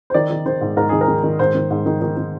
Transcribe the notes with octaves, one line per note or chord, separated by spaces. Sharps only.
C5
D#3 D5
D#3
D#3 C5
G#2
G#2 A#4
D#3 G#4
A#4
D#3
D#3
G#2 C5
D#3
G#2
D#3
D#3
D#3